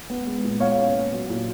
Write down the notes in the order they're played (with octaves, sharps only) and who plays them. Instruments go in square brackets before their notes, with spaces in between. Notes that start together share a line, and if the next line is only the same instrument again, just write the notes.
[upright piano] B3
G#3
A#2
B3 C#5 F5
C#4
A#2
F#3
A#2